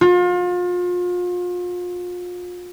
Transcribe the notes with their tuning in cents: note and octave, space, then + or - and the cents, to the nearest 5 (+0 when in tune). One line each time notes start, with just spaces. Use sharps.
F4 +35